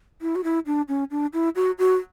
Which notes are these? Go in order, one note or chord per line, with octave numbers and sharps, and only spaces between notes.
E4
F#4
E4
D4
C#4
D4
E4
F#4
F#4